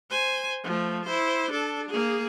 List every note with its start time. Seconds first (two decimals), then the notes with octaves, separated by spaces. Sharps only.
0.10 C5 G#5
0.64 F3 A3
1.05 E4 C5
1.51 D4 A4
1.89 A#3 G#4